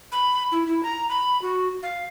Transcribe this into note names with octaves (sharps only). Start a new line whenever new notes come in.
B5
E4
E4
A#5
B5
F#4
F5